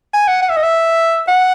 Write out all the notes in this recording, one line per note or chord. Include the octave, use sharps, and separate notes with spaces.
G#5
F#5
F#5
E5
D#5
E5
F#5